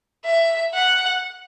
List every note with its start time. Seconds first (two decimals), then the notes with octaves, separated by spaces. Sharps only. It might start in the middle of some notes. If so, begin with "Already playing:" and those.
0.25 E5
0.74 F#5